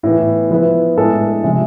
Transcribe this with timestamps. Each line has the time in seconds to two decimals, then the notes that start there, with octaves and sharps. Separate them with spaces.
0.03 A2 E3 B3
0.50 F3 B3 E4 B4
0.97 A2 G#3 D4 A4
1.44 C3 F3 G#3